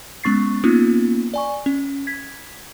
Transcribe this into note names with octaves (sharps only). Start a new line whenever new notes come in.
G#3 B3 C#4 C#6 A6 C7
A#3 B3 C#4 D#4 F4
D5 G#5 C#6
C#4
G#6 B6